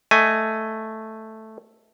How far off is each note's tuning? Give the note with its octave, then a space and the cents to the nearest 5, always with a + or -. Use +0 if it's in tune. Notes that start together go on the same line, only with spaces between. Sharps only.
A3 +0 D#5 +0 G#5 +0